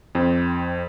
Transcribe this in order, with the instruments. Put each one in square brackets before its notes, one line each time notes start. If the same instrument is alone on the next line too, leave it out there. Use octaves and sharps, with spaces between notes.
[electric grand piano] F2 C4